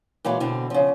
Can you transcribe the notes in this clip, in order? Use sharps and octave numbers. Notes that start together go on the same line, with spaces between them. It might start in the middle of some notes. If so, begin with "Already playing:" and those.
A#2 E3 F#3 G#3
B2 D3 C4
C#3 F3